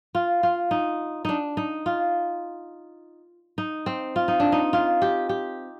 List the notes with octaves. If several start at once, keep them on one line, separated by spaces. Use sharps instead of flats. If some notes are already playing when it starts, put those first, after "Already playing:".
F4
F4
D#4
D4 D#4
D#4
F4
D#4
C4
F4
D#4
D4
D#4
F4
G4
G4